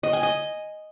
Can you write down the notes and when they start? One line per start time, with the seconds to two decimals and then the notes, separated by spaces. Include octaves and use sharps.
0.03 D#5
0.13 G#5
0.23 D#5